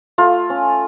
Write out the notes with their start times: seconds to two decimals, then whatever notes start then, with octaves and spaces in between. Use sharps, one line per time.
0.18 A3 F4
0.50 C#4